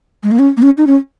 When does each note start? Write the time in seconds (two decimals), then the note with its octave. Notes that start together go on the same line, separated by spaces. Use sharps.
0.23 G#3
0.31 A#3
0.39 C#4
0.57 A#3
0.62 C#4
0.77 D#4
0.87 C#4